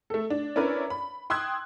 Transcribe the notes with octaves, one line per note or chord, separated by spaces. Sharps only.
A3 A4
D4
C#4 D4 E4 A#4 B4 D5
B5
G5 C6 D#6 E6 F#6 G#6